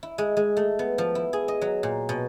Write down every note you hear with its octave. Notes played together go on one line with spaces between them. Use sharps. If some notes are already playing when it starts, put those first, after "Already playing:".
E4
G#3
G#3
A3
B3
F3
E4
G#4
D#5
F#3
A#2
B2